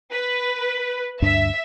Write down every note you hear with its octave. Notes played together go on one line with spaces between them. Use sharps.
B4
D2 G2 D4 E5